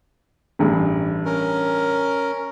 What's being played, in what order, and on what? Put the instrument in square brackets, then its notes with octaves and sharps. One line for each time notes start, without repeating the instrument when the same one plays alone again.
[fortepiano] A1 G2
[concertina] C#4 A#4